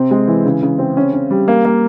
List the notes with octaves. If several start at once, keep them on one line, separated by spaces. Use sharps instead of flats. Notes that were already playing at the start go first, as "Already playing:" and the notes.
Already playing: C3 C4
G#3
E3
C#3
C#3
C4
C#4
C#4
G3
A#3
A#3